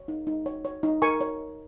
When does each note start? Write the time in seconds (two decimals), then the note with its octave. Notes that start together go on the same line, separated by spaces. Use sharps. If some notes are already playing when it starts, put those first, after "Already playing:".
Already playing: C#5
0.08 D#4
0.27 D#4
0.46 C#5
0.65 C#5
0.83 D#4
1.02 A#4 G#5 C#6
1.21 C#5